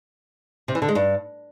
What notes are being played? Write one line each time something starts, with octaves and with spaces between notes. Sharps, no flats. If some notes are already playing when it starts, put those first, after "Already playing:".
C3
E3
D3
G#3
G2